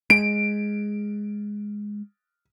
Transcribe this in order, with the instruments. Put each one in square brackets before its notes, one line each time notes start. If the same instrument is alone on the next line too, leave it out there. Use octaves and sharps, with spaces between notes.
[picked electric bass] G#3 [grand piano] D7